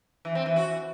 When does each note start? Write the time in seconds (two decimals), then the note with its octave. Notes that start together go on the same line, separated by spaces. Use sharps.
0.25 E3
0.35 C4
0.46 E3
0.56 F#4